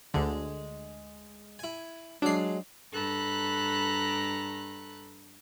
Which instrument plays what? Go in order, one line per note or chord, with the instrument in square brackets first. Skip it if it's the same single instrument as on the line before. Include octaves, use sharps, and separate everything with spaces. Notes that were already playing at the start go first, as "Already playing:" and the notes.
[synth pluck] D2 D3 [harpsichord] G#3
[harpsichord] E4 G#5
[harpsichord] F#3 G#3 [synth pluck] D4 C7
[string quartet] G2 A4 A#5 B5 F#6